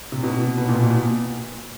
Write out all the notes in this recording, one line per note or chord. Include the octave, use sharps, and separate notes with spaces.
C3
B2
B2
A#2
B2